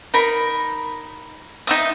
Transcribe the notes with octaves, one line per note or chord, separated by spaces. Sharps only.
D#4 A#4 B5
D#4 E5 D#6